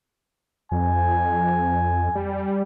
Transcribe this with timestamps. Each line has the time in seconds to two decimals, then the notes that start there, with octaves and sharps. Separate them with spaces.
0.72 F2 G#5
2.15 G3